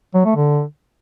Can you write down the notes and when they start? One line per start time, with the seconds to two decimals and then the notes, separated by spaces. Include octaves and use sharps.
0.14 F#3
0.25 A3
0.36 D3